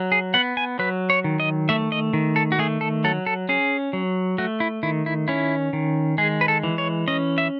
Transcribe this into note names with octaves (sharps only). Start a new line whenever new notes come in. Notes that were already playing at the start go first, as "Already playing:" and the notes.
Already playing: F#3
G#4
B3 F#5
G#5
F#3 B4
C#5
D#3
D#5
A3 E5
D#5
D#3
A4
F#4
A3 G#4
A4
F#3 A4
A4
C#4 G#4
F#3
A3 F#4
E4
D#3 E4
E4
C#4 E4
D#3
G#3 G#4
B4
A4
E3
C#5
C#4 D#5
E5